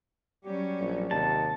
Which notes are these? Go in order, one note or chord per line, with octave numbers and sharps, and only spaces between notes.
F#3 G3 C#4 G4
A#1
D#2 C3 A5